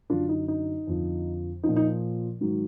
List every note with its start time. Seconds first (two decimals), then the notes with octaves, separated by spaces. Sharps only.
0.10 F#2 D3 F#3 D4 F4
0.29 D#4
0.48 D#4
0.87 F2 D3 F3
1.63 A#2 F3 D#4
1.76 D#4
2.41 G#2 D#3 F#3